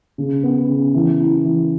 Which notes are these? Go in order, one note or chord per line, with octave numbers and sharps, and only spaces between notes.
C#3
B3
C#3
E3
E4
E3